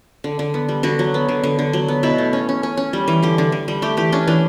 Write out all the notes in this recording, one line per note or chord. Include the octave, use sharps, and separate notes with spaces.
D3
D3
B3
G3
D3 F#4
F#3
B3
D3
D3
D3
F#3
B3
B2 E4
A3
C#4
C#4
C#4
C#4
G3
E3
D3 G4
D3
D3
G3
A3 G4
E3 G4
C#4 D4
E3 D4